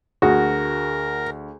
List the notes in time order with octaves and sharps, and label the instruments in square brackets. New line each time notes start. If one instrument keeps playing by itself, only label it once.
[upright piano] D2 [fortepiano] F#4 [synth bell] G#4 [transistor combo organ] A#4